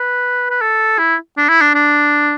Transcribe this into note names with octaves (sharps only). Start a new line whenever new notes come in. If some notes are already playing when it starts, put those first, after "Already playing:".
Already playing: B4
B4
A4
E4
D4
E4
D4
D4